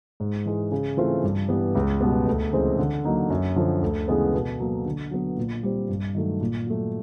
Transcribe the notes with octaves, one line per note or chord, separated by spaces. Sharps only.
G#2
E3 G#3
C#3
E3 A3 C4 F4
G2
E3 G3 B3
C#2
B2 G3 B3
D2
C#3 E3 G#3 C4
D3
F#3 A#3 D#4
F#2
D3 F3
D2
C#3 E3 G#3 B3
B2
F#3 A#3
D3
F#3 B3
A#2
G3 C4
G2
D#3 F#3 A3
A#2
F#3 A3